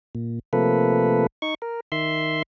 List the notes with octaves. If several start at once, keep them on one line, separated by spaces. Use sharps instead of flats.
A#2
C3 F3 A3 A#3 A4 B4
D#4 C#6
A#4
D#3 E5 C6